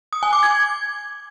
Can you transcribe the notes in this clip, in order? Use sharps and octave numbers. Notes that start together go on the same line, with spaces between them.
D#6
G#5
D6
G#6